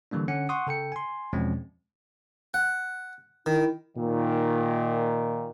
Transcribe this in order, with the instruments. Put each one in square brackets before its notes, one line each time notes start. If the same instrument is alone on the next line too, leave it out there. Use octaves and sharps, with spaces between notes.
[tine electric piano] D3 E3 G3 A#3 D4
D3 C#4 F#5 C#7
F#5 C6 C#6 D#6
C#3 A4 G5 C#7
G#5 C6
E2 B2 F3 G#3 C4 C#4
[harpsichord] F#5
[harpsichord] D#3 [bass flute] E4
[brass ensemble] A#2 D#3